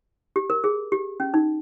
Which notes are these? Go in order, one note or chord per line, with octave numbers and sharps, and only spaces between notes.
G4
A#4
G#4
G4
C#4
D#4